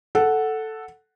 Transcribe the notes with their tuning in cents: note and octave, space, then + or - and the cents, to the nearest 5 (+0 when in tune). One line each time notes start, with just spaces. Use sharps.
A4 +0 F#5 +0